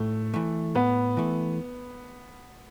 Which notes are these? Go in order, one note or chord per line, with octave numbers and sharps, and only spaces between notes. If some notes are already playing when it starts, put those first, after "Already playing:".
Already playing: A2 A3
E3 A3
A2 B3
E3 A3